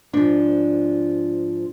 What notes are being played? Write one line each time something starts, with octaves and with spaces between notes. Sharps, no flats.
G#2 F3 D4